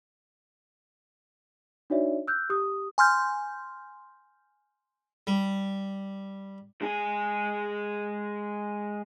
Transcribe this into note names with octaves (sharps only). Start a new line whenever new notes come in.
D4 D#4 F#4 C#5 D5 E5
E6 F#6 G6
G4 D#6
G#5 C6 F6 G6
G3
G#3 G#4